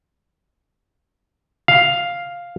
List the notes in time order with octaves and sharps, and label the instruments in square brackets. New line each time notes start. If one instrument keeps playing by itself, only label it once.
[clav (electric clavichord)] F5